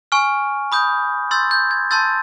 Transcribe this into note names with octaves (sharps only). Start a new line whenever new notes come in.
G#5 C#6 F6
B5 D#6 G6
C6 E6 G6 A6
G6
G#6
A5 C6 E6 G6 A6